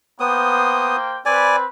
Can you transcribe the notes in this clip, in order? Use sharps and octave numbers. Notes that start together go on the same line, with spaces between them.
A#3 B3 C5 G5 D#6
C4 B4 D5 G#5